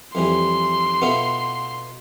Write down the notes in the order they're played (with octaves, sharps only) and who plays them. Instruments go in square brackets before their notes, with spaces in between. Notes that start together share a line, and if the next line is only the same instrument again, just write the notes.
[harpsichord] F2 E3 G3 [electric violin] C6
[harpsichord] B2 B3 F4 A4 E5